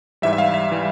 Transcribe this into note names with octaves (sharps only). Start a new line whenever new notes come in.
G#2 E3 G3 E5
E5
F5
E5
E3 G3